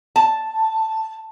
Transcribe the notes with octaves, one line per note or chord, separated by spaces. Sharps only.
A5